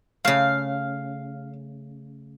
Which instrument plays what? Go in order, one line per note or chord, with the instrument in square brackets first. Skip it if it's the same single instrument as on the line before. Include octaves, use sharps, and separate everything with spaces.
[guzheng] C#3 A3 [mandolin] F5